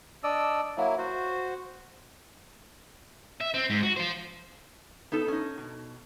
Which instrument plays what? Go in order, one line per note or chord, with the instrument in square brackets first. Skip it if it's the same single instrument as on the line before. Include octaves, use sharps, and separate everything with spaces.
[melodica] D4 D5 D#5 E6
F#3 A#3 E4
F#4 C5
[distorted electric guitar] E5
C4
G#2
F#4
F4 C5
[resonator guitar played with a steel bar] B3 D#4 A4
C#4 D#4
B2